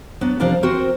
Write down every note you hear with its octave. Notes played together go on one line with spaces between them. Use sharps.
F#3 B3 D4
C3 F3 C4 D4 A#4 A5
C4 F#4 A#4 C5